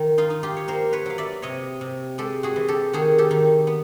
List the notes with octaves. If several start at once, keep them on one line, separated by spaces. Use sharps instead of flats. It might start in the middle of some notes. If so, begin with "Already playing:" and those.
Already playing: D#3
D#4 F4
D#4
F4 G4
C#5
A#3 A#4 C5
B4 C#5
F#3 F5
D5 E5
C3 C#5 D#5
C3
G#3 G4 A4
F#4 G#4
E3
G4 A4
D#3 F#4 G#4
G4 A4
D#3
B3